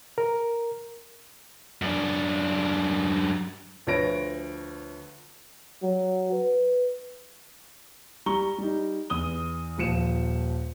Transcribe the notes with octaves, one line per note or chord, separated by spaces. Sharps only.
A#4
F#2 D4
D2 F3 B4 C#5 A#6 D7
F#3
B4
G3 A#5 C#6 G7
G3 D#4
E2 D#6 G7
D#1 F3 C#7 E7